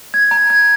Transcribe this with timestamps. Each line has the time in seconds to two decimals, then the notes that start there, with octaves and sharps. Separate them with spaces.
0.14 G#6
0.31 A#5
0.50 G#6